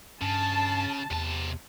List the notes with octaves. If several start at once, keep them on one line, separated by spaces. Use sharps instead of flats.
G2 C#3 A5
E2 C3 A5